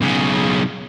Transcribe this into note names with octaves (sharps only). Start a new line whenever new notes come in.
B1 C#3